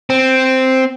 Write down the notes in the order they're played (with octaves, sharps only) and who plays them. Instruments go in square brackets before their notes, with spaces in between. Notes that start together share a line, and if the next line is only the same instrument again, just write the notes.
[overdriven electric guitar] C4